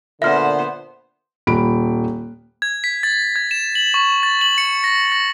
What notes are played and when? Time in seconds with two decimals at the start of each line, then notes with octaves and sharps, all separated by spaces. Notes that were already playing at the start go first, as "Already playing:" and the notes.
0.22 A#2 D3 B3 C5 E5 F6
1.47 D#1 B5 D7
2.62 G#6
2.84 B6
3.03 A6
3.36 G#6
3.51 E7
3.75 F#7
3.94 C#6
4.23 A6
4.41 F#7
4.58 C#7
4.84 A#6
5.12 A#6